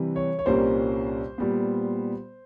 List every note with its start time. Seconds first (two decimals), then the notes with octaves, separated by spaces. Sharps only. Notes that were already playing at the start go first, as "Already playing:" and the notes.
Already playing: C3 E3 G3
0.16 C#5
0.39 C#5
0.46 C2 A#2 G3 A#3 C#4 C5
1.38 A#2 G3 B3